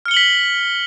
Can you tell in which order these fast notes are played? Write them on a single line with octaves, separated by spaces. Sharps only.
F6 C#7 G7 F#7 B6